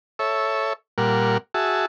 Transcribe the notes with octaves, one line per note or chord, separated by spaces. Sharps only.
A4 C#5 E5
A#2 G3 A#4 F#5
F#4 G#4 E5 A5